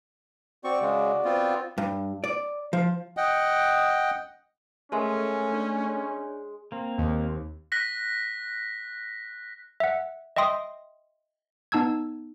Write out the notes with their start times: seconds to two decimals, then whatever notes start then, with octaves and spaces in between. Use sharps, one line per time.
0.64 C4 F#4 D5 C#6
0.81 C#3 G#3
1.25 B3 C4 F4
1.78 G2
2.24 D5
2.73 F3
3.17 D#5 F#5 G5
4.92 G#3 A3 C#4 A4 A#4 E5
5.52 D4 C#5
6.72 A#3 C4
6.98 D#2
7.72 F#6 A#6 B6
9.80 E5 F#5
10.36 D#5 E5 G5 C6 D#6
11.72 B3 D#4 A5 E6 G#6